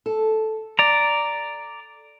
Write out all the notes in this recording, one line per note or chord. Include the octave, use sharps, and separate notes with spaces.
A4
D5 A#5